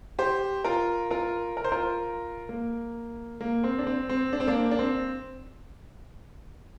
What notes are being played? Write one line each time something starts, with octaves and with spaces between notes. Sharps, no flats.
G4 C5
F4 A#4
F4 A#4
A#4
C5
F4 A#4
A#3
A#3
C4
D4
C4
C4
D4
C4
A#3 D4
D4
C4